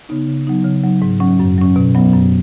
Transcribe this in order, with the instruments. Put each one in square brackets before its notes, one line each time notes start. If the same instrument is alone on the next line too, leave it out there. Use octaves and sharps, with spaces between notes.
[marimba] C#3 B3 D#4
C#3
F#3 B3 D#4
C#3
F#3 D#4
G#2
F#3 C#4
F#2
F#3 C#4
B2
F#3 B3
F#2